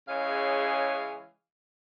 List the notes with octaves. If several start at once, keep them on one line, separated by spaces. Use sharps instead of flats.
C#3 E3 G#3 G#4 C#5 F5